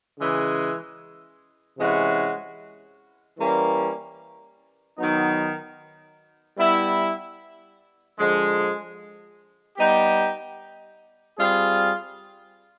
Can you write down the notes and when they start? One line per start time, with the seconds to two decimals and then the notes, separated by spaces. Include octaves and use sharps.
0.17 C#3 E3 G#3
1.77 C3 E3 G#3 C#4 F#4
3.38 E3 G3 A#3 C#4
4.97 D#3 F#3 B3 D#4
6.57 G3 B3 E4
8.17 D3 F3 G#3
9.76 G3 B3 D#4 G4
11.37 G3 C4 F4 G#4